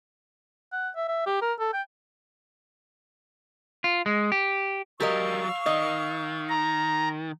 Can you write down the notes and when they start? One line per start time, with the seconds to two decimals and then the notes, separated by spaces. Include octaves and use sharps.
0.72 F#5
0.96 E5
1.08 E5
1.26 G4
1.42 A#4
1.60 A4
1.73 G5
3.84 F4
4.06 G#3
4.32 G4
5.00 F#3 G3 G4 A#4 D#5 F5 C#6 E6
5.66 D#3 D#5
6.49 A#5